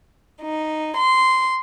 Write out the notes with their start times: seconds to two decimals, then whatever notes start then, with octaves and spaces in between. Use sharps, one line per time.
0.41 D#4
0.97 C6